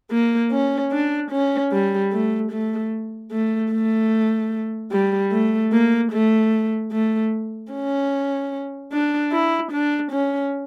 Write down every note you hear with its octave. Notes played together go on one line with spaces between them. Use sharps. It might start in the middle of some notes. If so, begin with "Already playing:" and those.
A#3
C#4
D4
C#4
G3
A3
A3
A3
A3
G3
A3
A#3
A3
A3
C#4
D4
E4
D4
C#4